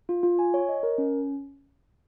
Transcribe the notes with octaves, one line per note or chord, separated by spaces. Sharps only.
F4
F4
G#5
C#5
D#5
A#4
C#4